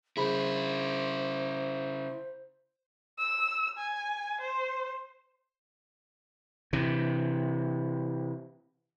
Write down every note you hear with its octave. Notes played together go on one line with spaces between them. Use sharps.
C#3 E4 G#4 C5 B5
E6
G#5
C5
C3 E3